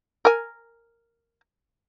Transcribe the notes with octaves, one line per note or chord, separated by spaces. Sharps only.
A#4 G#5